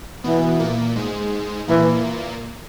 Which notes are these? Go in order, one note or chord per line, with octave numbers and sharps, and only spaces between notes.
B2 E3 B3
A#2 A#3
G#2 G#3
A#2 E3 A#3